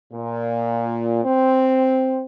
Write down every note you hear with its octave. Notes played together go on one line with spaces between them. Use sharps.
A#2
C4